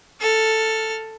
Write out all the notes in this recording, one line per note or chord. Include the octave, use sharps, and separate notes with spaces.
A4 F6